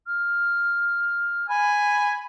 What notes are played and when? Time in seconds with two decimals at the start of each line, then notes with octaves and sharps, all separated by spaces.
0.06 F6
1.49 G#5 B5